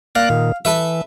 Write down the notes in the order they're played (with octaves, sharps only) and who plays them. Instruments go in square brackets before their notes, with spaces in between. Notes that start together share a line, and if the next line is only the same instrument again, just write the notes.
[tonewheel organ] A#3 D5 F#6 [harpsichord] F5
[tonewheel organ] A#2 D#3
[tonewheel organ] E3 [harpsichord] A4 B4 E5